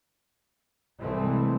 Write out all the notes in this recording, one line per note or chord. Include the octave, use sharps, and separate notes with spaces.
C2 E3 G#3 A3 C4